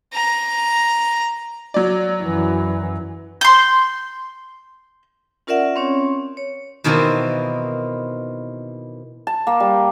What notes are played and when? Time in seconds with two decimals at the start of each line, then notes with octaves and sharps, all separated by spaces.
0.14 A#5
1.74 F#3 D5
2.22 F#2 E3
3.41 C6 G6
5.47 C#4 F4 A#4 D5 E5 F#5
5.76 C4 C#4 C#5
6.37 C#5
6.84 B2 D#3 E3 A#3 C4
9.27 A5
9.47 A#3
9.60 G3